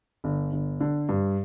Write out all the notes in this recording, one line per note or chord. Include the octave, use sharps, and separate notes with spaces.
G1
G1
D3
G2